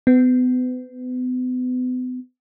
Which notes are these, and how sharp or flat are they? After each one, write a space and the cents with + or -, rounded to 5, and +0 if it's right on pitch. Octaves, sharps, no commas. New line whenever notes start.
B3 +35